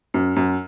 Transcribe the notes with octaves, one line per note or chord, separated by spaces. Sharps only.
F#2
F#2